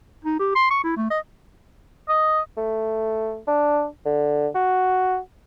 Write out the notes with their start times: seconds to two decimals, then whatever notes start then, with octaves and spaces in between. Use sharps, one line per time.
0.25 D#4
0.40 G4
0.56 C6
0.71 C#6
0.84 E4
0.96 A3
1.10 D#5
2.09 D#5
2.57 A3
3.48 D4
4.05 D3
4.55 F#4